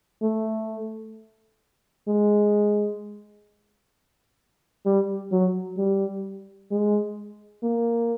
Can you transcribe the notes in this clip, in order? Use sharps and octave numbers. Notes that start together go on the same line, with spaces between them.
A3
G#3
G3
F#3
G3
G#3
A#3